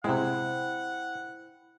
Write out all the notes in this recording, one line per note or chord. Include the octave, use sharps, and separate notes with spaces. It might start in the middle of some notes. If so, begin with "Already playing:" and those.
C3 G#3 E4 C5 F#5 G5